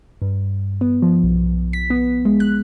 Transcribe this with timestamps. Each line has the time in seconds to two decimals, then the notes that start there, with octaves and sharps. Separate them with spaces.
0.22 G2
0.81 B3
1.02 F3
1.23 B1
1.73 B6
1.90 B3
2.25 G#3
2.40 F#6